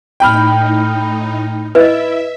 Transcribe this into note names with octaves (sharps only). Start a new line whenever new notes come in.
A2 D#4 G5 B5 F6
E4 B4 D#5 E5